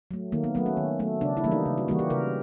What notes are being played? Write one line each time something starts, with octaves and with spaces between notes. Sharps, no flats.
F#3 A3
D#3 A#3
B3
F#3 A3 B3
C#4
D#3
F#3 A3
C#3 D4
E4
E3 G3 A#3
D#4
C#3
F#4
E3 G3 A#3 F#4
G4
C#3 A#4